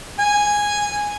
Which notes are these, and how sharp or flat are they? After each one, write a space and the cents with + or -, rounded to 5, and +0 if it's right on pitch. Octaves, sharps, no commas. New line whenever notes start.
G#5 -5